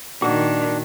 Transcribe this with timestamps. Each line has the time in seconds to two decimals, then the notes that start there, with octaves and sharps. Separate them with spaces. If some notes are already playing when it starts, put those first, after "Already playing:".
0.22 A#2 D#3 A#3 D4 F#4